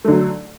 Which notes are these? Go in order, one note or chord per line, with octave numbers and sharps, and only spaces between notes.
D3 F#3 A3